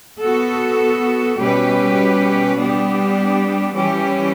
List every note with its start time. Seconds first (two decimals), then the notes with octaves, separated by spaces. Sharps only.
0.21 B3 F#4 A4
1.38 B2 G3 C#4 G4 B4
2.57 G3 B3 D4 G4
3.75 E3 G3 C#4 G4